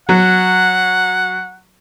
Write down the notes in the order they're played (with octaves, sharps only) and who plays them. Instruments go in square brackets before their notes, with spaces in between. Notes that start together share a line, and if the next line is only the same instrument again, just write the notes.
[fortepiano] F#3 [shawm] F#5